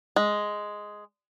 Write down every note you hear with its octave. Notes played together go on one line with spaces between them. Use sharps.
G#3